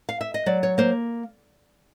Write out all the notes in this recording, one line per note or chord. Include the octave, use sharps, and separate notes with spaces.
F5
E5
D#5
F#3 D5
C#5
A#3 C5